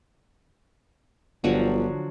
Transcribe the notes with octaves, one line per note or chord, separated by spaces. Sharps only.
G1 D3 F3 F#3